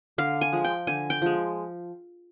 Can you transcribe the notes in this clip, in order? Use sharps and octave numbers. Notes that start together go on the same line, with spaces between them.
D3 F5
G#5
F3 G#3
G5
D3 G#5
G5
F3 G#3